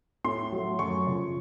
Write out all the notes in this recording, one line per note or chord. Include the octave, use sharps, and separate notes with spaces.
A2 C6
F#3 A3
F#2 C#6
C#3 F3